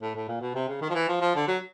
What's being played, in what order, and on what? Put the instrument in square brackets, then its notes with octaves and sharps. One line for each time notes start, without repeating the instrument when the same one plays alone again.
[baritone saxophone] A2
A2
A#2
B2
C3
C#3
D#3
F3
E3
F3
F3
D3
F#3